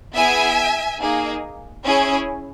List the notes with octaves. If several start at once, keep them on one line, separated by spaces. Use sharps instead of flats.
B3 E4 G#4 E5 G#5
A#3 D#4 G#4
C#4 E4 G#4